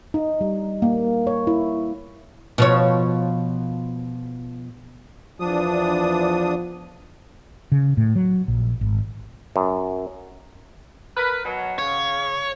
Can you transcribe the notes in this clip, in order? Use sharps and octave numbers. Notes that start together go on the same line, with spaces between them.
D#4
G3
A#3
C#5
E4
B2 F3 C#5
E2 F3 D4 D#6
C#3
A2
F#3
A#1
G#1
F#2
A#4 B4
B2 F#3
C#3 C#5